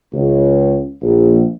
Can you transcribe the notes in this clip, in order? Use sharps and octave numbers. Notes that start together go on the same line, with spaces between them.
C#2
A#1